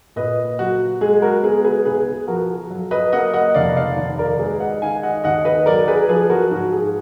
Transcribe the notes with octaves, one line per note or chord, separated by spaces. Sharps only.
A#2 B4 D#5
F#3 F#4
G#3 G#4
F#4 A#4
B3 G#4
G#4 B4
B1 G#4 B4
G#4
F3 F#4 A#4
F#3
B4 D#5
A#3 D#5 F#5
D#5 F#5
F1 D5 F5
D5 F5
D#2
A#4 D5
G#3 G#4 B4
D#5 F#5
D#3 F5 G#5
D#5 F#5
D#2 D#5 F#5
B4 D#5
F#3 A#4 D5
G#4 B4
F3 G#4 B4
F#4 A#4
G#2 F#4
G#4